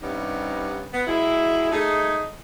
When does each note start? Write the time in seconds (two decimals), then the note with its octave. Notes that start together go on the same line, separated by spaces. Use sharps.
0.02 G2 C3 G3 B3 C#4 D#4
0.93 B3
1.07 E3 F#3 G#3 E4
1.72 A3 D#4 G#4